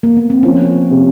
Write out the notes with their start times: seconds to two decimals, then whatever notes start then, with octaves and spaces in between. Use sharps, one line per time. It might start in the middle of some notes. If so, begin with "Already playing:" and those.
0.03 A#3
0.17 B3
0.30 C4
0.43 F3 C#4
0.91 C3